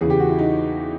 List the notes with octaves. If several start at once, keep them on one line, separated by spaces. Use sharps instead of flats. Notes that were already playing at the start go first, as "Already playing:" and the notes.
E2 C#3 E3 G#4
G4
F#4
E4
D#4